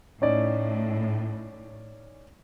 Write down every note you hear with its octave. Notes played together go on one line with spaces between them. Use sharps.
A2 C#4 D#4 D5